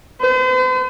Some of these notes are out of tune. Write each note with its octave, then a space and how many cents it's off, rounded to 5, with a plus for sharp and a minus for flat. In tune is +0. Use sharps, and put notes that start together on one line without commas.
C5 -45